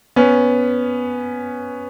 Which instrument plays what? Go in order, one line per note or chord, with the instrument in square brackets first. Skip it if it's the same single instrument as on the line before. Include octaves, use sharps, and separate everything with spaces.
[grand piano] B3 C#4